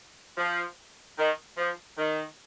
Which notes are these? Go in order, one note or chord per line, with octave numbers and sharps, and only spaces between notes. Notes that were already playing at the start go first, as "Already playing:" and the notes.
F3
D#3
F3
D#3